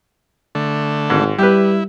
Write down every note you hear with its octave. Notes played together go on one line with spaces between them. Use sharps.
D3 A3
G#1 G#2
G3 E4 G4 B4